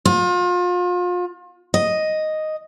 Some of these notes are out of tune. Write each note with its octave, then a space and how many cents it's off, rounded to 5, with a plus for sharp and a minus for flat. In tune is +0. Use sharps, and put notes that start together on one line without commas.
F4 +35
D#5 +0